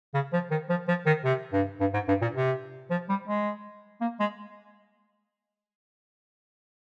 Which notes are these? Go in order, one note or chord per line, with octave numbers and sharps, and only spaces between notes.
C#3
F3
D#3
F3
F3
D#3
C3
G2
G2
G#2
G2
A#2
C3
F3
G3
G#3
A#3
G#3